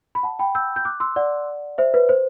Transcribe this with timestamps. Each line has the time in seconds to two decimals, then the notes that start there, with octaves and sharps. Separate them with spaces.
0.15 B5
0.23 F#5 A5
0.39 G5 B5
0.55 E6 G6
0.76 G6
0.85 D6 F#6
1.00 C6 E6
1.16 D5 F#5
1.78 C5 E5
1.94 B4
2.09 C5